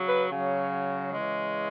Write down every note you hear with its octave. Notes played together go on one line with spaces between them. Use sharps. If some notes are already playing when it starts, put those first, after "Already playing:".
Already playing: C#3 F#3
B4
C#3 F#3
C#3 E3 G#3